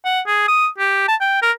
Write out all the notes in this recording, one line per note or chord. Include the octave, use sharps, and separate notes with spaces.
F#5
G#4
D#6
G4
A5
G5
A#4